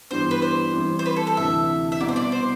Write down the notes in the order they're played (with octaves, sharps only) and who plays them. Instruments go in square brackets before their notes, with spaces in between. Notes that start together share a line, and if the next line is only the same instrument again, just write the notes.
[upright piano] G2 E3 G3 B3 D4 [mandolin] C5
[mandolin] B4
C5
[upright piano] E3 G3 C4 E4
[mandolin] C5
B4
A4
A4
[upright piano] D2 C3 E3 [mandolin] E5
[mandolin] E5
[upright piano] C2 B2 B3 [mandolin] D5
[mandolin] C5
D5
C5